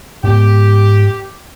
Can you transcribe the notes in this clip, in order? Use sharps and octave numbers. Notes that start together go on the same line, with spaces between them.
G#2 B3 G4